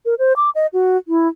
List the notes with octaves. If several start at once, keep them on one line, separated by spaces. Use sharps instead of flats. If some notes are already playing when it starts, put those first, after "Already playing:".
A#4
C5
D6
D#5
F#4
E4